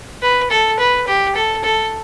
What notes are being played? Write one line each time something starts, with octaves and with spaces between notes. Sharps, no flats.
B4
A4
B4
G4
A4
A4